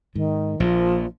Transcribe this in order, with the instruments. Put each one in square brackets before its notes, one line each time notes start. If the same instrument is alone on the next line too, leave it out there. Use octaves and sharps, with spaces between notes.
[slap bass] G#2 [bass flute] D#3
[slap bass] A#1 A#2 [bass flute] F3